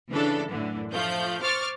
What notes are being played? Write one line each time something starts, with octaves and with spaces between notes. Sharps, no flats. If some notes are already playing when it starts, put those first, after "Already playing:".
C#3 E3 D4 A4
F#2 A2 D3 E3
F3 A3 F5 G6
C5 C#6 D6 F6 A6